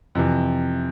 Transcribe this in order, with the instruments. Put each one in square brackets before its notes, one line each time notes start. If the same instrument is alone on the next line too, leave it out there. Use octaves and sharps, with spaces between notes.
[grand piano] F2 C3 E3